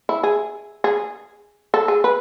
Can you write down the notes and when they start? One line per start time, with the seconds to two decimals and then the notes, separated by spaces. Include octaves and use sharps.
0.09 E4
0.23 G#4
0.84 G#4
1.74 A4
1.88 G#4
2.04 B4